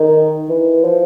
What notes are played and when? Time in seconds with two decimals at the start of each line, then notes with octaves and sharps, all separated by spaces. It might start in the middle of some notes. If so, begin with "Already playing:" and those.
Already playing: D#3
0.49 E3
0.84 F3